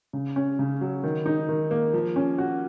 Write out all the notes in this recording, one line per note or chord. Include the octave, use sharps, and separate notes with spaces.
C#3
C#4
C#3
F#3
D#3
D#4
D#3
A#3
F3
C#4
F#4